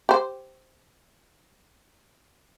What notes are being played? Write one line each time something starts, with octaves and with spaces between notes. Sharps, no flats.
G4 C5